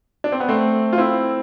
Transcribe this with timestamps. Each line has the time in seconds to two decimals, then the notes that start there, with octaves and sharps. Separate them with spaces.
0.24 D4
0.32 C4
0.40 B3
0.49 A3 C4
0.93 F4
0.98 C4 E4